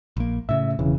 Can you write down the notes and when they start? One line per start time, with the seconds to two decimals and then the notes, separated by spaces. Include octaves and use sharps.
0.17 A#1 A#3
0.49 A2 C#3 E5
0.79 E1 C#3 E3